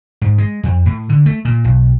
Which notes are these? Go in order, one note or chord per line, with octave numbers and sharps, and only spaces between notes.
G#2
G#3
F2
A2
D3
A3
A#2
B1